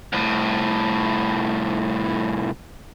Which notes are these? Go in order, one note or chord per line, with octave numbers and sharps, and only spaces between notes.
C2 A2